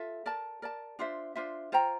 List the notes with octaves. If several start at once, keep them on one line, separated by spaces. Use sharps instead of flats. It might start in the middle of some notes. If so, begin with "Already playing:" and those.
Already playing: F4 A4 E5
A#4 D5 A5
A#4 D5 A5
D4 F4 C5 E5
D4 F4 C5 E5
F4 C5 G5 A#5